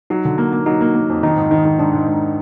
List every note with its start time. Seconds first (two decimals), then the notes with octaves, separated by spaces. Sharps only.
0.10 F#3 D#4
0.25 D3
0.38 A#3
0.53 A#3
0.66 F#3 D#4
0.81 A#3
0.94 A#3
1.09 F2
1.23 D#3 D#4
1.37 G#2
1.51 D#3
1.65 D#3
1.79 G#2 D4
1.93 G#2
2.07 G#2